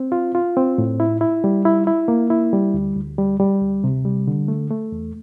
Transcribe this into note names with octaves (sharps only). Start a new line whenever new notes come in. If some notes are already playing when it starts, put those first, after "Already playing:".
Already playing: C4
F4
F4
C4
A2
E4
E4
G3
E4
E4
A#3
E4
G3
D2
D2
G3
G3
D2
C3
G3
D3
A3
A3
E2